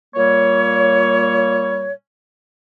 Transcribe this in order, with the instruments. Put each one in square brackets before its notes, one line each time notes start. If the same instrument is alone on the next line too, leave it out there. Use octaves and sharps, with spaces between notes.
[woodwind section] A#2 G3 A#3 C#5